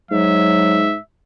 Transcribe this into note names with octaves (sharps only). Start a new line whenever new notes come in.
G#2 F#3 E5